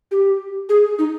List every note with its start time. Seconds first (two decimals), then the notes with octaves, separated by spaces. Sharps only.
0.11 G4
0.69 G#4
0.99 D#4